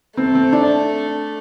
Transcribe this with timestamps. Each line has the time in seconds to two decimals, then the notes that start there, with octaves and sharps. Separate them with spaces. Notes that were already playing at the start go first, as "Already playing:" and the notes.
0.17 A3 C4
0.35 C4
0.53 D4